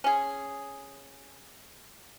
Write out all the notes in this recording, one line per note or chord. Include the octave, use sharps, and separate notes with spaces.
C#4 G#4